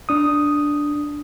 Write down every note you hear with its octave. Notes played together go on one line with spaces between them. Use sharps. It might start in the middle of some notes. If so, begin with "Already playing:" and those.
D4 D#6